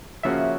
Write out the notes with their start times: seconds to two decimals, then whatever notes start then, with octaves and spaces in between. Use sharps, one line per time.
0.23 C#3 F3 A#3 C#4 F#4 E5